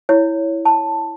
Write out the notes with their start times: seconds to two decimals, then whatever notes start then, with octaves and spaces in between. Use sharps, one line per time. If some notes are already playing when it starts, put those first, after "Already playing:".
0.09 E4 C#5
0.65 A5